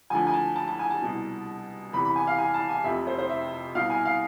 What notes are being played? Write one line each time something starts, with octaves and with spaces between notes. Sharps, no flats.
D2 D3 F3 G#5
G#5
A5
A5
A5
G#5
A5
C2 B2
E2 C3 E3 B5
B5
G#5
F5
G#5
A5
G#5
F1 F2 C3 E5
C5
C5
E5
C2 B2 F5
G#5
F5